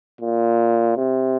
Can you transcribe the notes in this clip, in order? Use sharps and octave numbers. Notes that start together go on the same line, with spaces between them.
A#2
C3